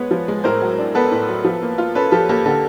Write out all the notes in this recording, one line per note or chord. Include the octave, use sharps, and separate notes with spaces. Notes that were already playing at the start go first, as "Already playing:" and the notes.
Already playing: G#3 B3 B4 C#5
F3
G#3
A2 A#4 C5
F#3
D4
B3 A4 B4
A2
F#3
F3
A#3
F4
C#4 A4 B4
F3 G4 A4
A#3 G4 A4
D3 G4 A4